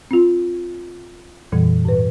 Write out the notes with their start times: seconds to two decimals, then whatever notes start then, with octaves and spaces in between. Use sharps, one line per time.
0.11 C4 F4
1.52 F2 A#2 E3 G3
1.85 G#2 B4